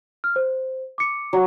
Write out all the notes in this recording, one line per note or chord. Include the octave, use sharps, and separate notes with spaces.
F6
C5
D6 C#7
F#3